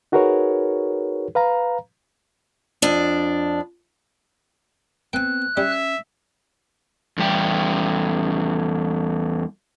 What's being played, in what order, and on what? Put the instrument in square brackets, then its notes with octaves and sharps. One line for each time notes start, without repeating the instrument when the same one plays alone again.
[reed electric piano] D#4 F#4 G#4 A#4 B4 C#5
B4 F5 A#5
[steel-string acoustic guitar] F2 D4
[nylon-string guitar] B3 C4 [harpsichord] G5 G#5 [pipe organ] F#6
[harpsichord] G3 [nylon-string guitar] C#4 [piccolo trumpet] E5
[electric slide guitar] E2 G3 G4